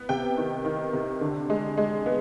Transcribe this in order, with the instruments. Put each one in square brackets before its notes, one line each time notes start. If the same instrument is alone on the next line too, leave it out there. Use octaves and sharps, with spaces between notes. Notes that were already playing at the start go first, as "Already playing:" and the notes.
Already playing: [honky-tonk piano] B3
C3 G5
D#3
D#3
C3
D3
G#3
G#3
B3